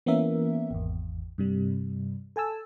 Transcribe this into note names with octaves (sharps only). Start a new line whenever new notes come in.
E3 A#3 B3 C#4 A#4 E5
G#1 E2
G2 C3 G3
A4 G#5 A5 E6